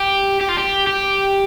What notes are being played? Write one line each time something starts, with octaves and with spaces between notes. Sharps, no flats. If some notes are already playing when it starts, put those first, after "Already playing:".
Already playing: G4
G4
F4
G4
G4